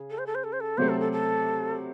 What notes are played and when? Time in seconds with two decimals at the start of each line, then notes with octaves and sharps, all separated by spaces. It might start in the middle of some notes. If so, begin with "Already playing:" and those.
Already playing: C#3 G#4
0.10 A4
0.18 C5
0.26 A4
0.35 C5
0.44 A4
0.53 C5
0.60 A4
0.77 C3 F#3 A3 C4 C5
0.89 A4
1.00 A4
1.12 A4